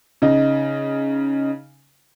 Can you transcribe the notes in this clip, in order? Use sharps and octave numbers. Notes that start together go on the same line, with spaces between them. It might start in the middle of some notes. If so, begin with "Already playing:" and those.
C#3 D#4